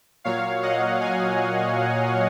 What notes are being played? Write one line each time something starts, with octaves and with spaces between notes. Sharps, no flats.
A#2 F#3 C#5 F5
D#5 F#5
F5 G#5